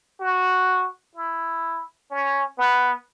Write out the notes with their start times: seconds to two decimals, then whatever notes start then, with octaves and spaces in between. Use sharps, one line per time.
0.20 F#4
1.15 E4
2.10 C#4
2.58 B3